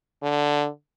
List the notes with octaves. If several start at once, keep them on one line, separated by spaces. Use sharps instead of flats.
D3